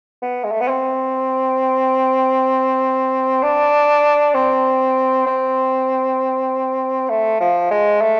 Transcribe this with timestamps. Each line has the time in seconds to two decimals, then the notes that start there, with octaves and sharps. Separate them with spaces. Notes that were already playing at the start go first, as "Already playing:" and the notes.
0.22 B3
0.44 G#3
0.51 A3
0.61 B3
0.68 C4
3.43 D4
4.34 C4
5.26 C4
7.10 A3
7.40 F3
7.71 G#3
8.02 A3